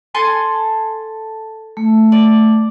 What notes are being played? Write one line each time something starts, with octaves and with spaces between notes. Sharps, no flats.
A4 G#5 C6
A3
D5